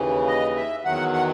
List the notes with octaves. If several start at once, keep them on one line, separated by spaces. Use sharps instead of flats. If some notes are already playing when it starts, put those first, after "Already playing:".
Already playing: D#2 C#3 E3
D#5
E5
E2 D#3 F#3 F#5
F#5